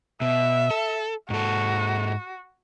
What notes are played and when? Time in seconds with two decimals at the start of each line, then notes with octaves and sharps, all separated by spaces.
0.21 B2 E5
0.71 A4
1.30 G#2 F#4 A4